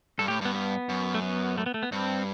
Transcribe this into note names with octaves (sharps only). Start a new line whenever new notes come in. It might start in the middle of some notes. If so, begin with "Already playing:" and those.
G2 A4
A2 G4
G2 B3
B3
F#2
A3
B3
A3
B3
A3
B3
G2 C4